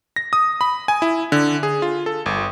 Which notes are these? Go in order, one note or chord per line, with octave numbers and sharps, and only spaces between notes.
A#6
D#6
B5
G#5
E4
D3
G#4
F4
A4
G1